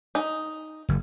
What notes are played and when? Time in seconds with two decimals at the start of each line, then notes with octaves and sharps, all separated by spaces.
0.15 D#4
0.89 F#1